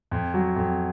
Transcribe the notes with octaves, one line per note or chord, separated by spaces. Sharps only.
F2
F#3
F2